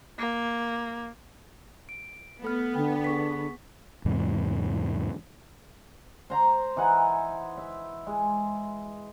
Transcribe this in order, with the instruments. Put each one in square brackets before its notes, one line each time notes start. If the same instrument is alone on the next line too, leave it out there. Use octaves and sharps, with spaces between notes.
[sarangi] A#3
[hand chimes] D7
[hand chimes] A3 A4 F6 [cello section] B3
[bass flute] D3 [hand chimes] G5
[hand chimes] G#4 C#6 B6
[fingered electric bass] E2 G#2 C3
[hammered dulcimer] C5 A#5 C6
E3 D#4 F#5 G#5
E5
G#3